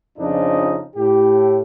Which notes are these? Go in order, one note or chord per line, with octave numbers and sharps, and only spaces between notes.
F2 C#3 F3 D4 D#4
A2 G4